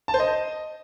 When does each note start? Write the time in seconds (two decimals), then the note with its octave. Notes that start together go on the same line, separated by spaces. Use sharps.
0.08 A5
0.14 C5
0.20 D#5